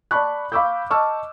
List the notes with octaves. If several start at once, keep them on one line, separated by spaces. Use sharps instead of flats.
D5 A5 B5 C#6 F#6
F5 B5 C#6 D6 E6 G6
D#5 A5 C#6 E6 F6